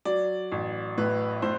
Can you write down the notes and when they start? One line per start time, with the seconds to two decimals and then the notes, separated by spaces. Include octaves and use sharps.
0.05 F#3 D5
0.52 A1
0.98 A2 B4
1.42 A2 C5